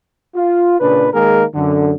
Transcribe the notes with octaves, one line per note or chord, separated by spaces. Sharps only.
F4
A#2 C#3 D4 B4
D#3 G#3 A#3 G#4 A#4
F#2 D3